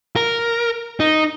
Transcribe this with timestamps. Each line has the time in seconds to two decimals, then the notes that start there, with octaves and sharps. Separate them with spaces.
0.16 A#4
1.00 D#4